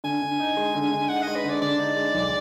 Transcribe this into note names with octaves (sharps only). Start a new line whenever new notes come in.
D3 G#5
D3
D#4
G#3
D3
D3
D#4 F#5
G#3 D#5
B4
D3
D5
D3 D5
D#4
G#3
B1